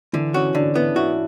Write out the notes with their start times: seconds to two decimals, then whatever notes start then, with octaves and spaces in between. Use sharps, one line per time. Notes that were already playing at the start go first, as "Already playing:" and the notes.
0.13 D3 E3
0.34 C#4 F#4
0.55 D3 D4
0.75 B3 E4
0.96 E4 F#4